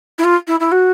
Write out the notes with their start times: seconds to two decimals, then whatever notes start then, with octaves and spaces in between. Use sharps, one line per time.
0.18 E4
0.24 F4
0.47 E4
0.60 E4
0.72 F#4